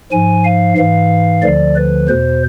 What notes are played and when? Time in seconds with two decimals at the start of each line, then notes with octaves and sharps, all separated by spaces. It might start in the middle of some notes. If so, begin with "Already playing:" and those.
0.12 G#2 F3 G#5
0.44 F5
0.77 G#2 E3 F5
1.42 D2 D3 F3 D5
1.75 B4
2.08 E2 B2 C5